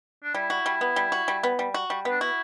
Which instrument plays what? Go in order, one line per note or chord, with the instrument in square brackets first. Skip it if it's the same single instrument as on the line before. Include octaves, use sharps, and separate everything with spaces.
[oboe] D4
[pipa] G3 [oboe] E4
[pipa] F#4
G3
B3
G3
F#4
G3
B3
G3
F#4
G3
[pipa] B3 [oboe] D4
[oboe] E4 [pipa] F#4